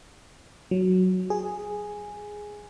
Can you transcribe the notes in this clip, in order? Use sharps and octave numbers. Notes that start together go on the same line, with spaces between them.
F#3
G#4